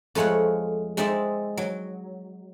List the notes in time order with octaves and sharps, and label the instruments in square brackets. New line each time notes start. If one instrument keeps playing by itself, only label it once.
[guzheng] F2 G#3 A3 C#5 F5 F#5
G#3 C4 D#4 D5 E5
F#3